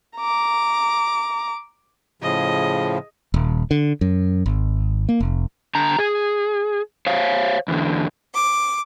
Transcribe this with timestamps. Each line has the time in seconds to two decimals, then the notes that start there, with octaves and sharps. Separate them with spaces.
0.17 A#5 D6
2.22 A2 C#3 F3 G#4 D#5
3.34 D#1
3.71 D3
4.01 F#2
4.46 G#1
5.09 A#3
5.20 F1
5.75 D3 A#5
5.99 G#4
7.07 C5 C#5 F5
7.68 E2 D3
8.34 D6